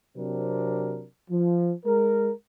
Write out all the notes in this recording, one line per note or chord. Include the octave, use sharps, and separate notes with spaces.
C3 F#3 C4 D4 A#4
F3
G#3 A#4